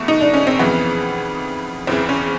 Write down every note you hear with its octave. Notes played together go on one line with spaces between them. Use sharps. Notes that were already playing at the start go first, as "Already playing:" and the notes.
Already playing: E2 B2 A3
D#4
D4
C#4
C4
F2 C#3 E3 B3
E2 C#3 E3 C4
C#4